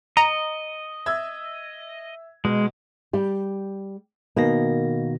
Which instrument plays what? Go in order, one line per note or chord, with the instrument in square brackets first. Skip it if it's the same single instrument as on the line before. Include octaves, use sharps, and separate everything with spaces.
[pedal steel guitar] D#5 [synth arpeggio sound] A#5 [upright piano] C#7 D#7
[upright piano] E5 E6 G#6
[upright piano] B2 [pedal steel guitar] G#3
[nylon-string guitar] G3 G4
[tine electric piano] B2 D#3 A#6 [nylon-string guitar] A#3